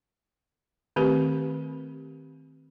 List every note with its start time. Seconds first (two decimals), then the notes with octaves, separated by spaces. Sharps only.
0.96 D#3 A3 C4 G4 A#4 B4